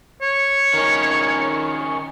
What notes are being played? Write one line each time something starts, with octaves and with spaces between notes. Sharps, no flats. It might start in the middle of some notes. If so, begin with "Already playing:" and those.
C#5
D#3 C#4